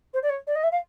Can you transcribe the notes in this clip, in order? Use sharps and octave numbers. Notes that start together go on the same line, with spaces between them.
C5
D5
C#5
D5
D#5
E5
F5